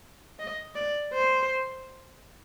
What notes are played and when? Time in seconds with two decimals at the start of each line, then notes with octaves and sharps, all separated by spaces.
0.39 D#5
0.76 D5
1.14 C5